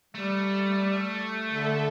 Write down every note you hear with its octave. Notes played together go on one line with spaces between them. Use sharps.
G3 A3
D3 A4 E5